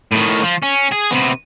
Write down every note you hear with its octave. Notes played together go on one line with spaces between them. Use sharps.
A2 D#3
F3
C#4
G#4
C3 B3